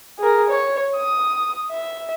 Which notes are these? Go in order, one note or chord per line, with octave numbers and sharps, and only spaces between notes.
G#4 A#4
C#5
D#6
E5